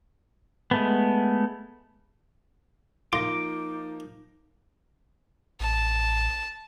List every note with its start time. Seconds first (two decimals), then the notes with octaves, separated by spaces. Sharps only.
0.71 G#3 A3 B3
3.13 F3 A#3 D#4 F4 D6 A#6
5.60 A1 A5